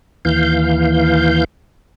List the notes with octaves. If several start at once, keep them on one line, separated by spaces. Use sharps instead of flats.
D#2 E3 F5 G6